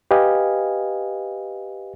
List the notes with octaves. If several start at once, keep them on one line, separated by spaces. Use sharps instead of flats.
G4 B4 D#5 F5 G#5